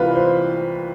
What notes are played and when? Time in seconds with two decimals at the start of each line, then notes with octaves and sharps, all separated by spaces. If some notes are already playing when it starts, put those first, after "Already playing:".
Already playing: C2 C3 E3 F4 B4
0.15 C5